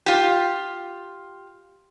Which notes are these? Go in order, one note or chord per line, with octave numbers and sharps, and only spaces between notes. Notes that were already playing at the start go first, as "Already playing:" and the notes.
F4 G4